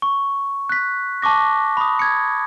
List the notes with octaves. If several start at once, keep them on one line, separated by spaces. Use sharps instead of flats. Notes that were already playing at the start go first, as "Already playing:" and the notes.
C#6
F#6 B6
A5 C#6 D6 A#6
B5 D#6
G#6 C#7